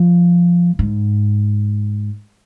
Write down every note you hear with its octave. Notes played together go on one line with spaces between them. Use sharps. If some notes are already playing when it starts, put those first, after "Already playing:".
Already playing: F3
G#2